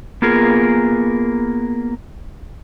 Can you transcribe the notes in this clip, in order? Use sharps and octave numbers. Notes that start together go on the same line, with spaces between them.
A#3 B3 F4 G#4 A#4